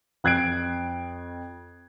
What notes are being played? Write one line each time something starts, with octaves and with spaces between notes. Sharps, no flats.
F2 F#6 G#6 C7 D7